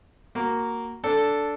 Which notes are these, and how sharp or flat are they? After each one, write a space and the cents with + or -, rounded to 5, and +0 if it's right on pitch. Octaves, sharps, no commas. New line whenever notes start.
A#3 -5 F#4 +0
D4 -10 A4 +0